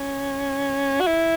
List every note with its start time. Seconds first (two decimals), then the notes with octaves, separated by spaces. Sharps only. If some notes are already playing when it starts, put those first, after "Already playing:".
Already playing: C#4
1.01 F#4
1.07 E4